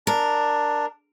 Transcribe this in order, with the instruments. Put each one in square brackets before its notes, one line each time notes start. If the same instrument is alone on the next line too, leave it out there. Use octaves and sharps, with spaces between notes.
[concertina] D4 [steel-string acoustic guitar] A#4